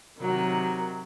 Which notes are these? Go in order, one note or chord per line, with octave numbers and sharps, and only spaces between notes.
C3 D#3 F#3